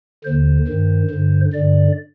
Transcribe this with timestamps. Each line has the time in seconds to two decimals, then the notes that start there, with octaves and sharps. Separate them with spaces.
0.24 D#2 D3 C5
0.68 G2 D#3
1.11 G2 D3
1.53 G2 D3 D5